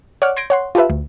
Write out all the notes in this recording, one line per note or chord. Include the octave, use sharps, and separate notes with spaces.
C#5 D5 F#5 D6 F6
C6 G6 G#6 A#6 C#7 D7
C#5 F#5 C6
F4 G4 A4 B4 E5
D2